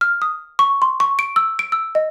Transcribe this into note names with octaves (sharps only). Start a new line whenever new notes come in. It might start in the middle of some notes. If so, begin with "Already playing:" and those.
F6
D#6
C#6
C6
C#6
D7
E6
D7
E6
D#5